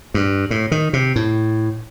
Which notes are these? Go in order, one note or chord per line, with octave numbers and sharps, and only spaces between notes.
G2
A2
D#3
C3
A2